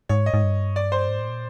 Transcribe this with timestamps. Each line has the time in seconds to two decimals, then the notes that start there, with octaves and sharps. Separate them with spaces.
0.09 G#2 C#5
0.26 D#5
0.34 G#2
0.43 G2
0.76 D5
0.92 C5
1.09 G#2
1.20 A2
1.29 A#2